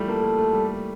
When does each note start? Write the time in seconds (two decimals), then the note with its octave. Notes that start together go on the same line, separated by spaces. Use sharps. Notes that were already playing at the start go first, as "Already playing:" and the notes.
Already playing: E3 F3 G3 A3
0.08 A#3 A4
0.23 A#3
0.38 A3
0.53 G3